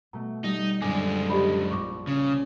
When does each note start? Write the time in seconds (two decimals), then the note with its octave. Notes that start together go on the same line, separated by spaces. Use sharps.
0.13 B2 A3 A#5
0.44 G3 D#4
0.82 F#2 D3 G#3 C4 D4 D#5 G#5 D6
1.30 G4 C5 D5 D#5 B5
1.71 A#1 C#6 D6
2.07 C#3 C#4